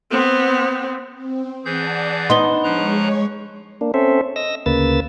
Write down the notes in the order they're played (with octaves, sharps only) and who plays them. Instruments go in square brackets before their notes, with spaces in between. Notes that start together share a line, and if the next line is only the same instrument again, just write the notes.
[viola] B3 C4
[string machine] C4
[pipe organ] E3 G#4 G6 [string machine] D5 F#5 A5
[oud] B3 D#4 [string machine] D4 [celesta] C6 G7
[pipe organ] F3 A#5 F#6 [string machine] G#3 C#5 C#6
[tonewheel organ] A#3 D4
C4 C#4 A4 C5 E5
D#5 E6 A#6
D2 C#3 A#3 B4 E6 A6